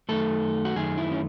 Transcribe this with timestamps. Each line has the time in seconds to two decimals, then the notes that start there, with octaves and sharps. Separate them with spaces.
0.09 F#2 D#3 A3 A4
0.65 F#4
0.76 F#2 D#3 A3 G#4
0.98 E4
1.11 C#4